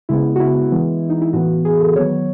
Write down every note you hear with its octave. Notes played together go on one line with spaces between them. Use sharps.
C#3 G#3 B3 E4
F#4
E4
E3 G#3 B3
D#4
E4
A2 E3 B3 F#4
G#4
A4
D#3 F#3 B3 C#5